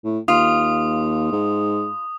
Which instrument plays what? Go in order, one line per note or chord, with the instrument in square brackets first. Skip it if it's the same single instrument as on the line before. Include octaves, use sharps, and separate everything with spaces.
[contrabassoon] A2
[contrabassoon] D#2 [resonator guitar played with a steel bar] F4 [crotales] D#6
[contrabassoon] G#2